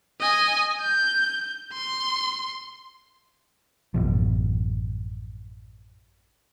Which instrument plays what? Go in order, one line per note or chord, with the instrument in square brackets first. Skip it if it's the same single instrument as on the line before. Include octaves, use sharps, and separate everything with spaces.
[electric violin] D#5 G#5
G6
C6
[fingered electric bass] A1 F#2 B2 F3